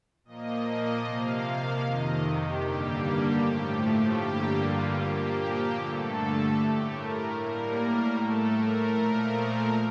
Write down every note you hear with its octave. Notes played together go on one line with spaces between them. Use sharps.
A#2 F3 A#3 D#5
D#5
C3 F3 A#3 F5
F2 C3 D#3 D#5
G4
G2 D3 G3 A#3
A2 F3 A3
G2 D3 G3 A#3 G4
F4
A#2 F3 A#3 G4
G2 D3 A3 A4
A2 A3 G4
A#4
A2 G3 A#3 A#4
A2 A3 A4
A#4
A#2 F3 A3